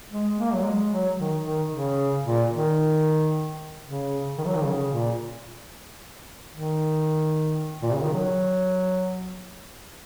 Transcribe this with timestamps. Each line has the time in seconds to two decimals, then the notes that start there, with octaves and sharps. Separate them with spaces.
0.11 G#3
0.38 A#3
0.54 F#3
0.64 G#3
0.91 F#3
1.18 D#3
1.44 D#3
1.71 C#3
2.25 A#2
2.51 D#3
3.85 C#3
4.38 D#3
4.46 F#3
4.55 D#3
4.65 C#3
4.91 A#2
6.52 D#3
7.82 A#2
7.93 C#3
8.03 D#3
8.13 F#3